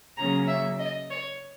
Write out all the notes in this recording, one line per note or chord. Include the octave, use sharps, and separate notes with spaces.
C#3 F#3 A#3 C#4 A#5
E5
D#5
C#5